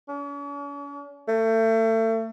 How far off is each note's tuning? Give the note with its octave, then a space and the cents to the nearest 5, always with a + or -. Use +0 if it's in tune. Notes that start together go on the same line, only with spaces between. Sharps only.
C#4 +45
A3 +30